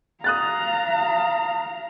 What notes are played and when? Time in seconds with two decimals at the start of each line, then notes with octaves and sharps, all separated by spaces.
0.24 F5 A#5 D#6 F#6 A6